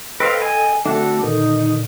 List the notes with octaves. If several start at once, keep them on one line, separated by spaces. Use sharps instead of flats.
A4 B4 C5 D#5 F5 G5
G#5
D3 A3 C4 D4 F#4 A4
A#2 D3 D#3 D#4